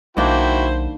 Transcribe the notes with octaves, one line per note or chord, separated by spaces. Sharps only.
B1 D#3 A#3 D4 E4 F#4 C5 G5